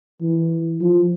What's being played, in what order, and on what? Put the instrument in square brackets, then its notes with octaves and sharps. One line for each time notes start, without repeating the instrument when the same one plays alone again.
[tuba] E3
F3